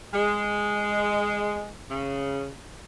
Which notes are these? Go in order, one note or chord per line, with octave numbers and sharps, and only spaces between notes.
G#3
C#3